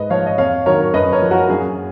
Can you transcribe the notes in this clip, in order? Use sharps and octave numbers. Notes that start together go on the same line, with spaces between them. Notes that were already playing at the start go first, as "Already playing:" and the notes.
Already playing: G#2 B4 D#5
F3 C#5 F5
D#5
F2 C#5 F5
D#3 F#3 A#4 C#5
F#2 B4 D#5
A#4 C#5
F3
F#4 A#4
F#2 G#4